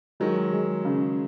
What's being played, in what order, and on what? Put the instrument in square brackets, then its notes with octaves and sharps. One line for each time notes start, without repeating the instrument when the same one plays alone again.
[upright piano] D#3 F#3 [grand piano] G#3
[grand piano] G#3
C#3